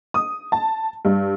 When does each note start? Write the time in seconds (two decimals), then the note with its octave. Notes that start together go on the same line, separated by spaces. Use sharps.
0.14 D#6
0.52 A5
1.05 G2